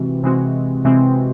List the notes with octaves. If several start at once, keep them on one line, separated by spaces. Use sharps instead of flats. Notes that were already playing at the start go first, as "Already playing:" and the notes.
Already playing: C3 E3 G#3 C4 F#4
C3 E3 G#3 C4 F#4
C3 E3 G#3 C4 F#4